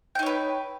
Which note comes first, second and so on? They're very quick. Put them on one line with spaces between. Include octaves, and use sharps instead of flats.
G5 D#4 C#5 B4